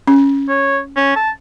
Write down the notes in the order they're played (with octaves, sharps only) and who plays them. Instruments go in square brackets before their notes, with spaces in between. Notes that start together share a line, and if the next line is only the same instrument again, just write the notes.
[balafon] C#4
[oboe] C#5
C#4
A5